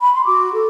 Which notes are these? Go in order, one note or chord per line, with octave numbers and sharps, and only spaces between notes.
B5
C6
F#4 D6
A4